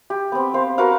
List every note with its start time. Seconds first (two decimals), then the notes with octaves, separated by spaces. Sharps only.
0.10 G4
0.32 B3 C4
0.54 C5 F5
0.78 F#4 A#4 B4 F5